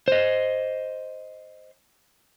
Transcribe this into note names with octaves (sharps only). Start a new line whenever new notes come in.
C5 D#5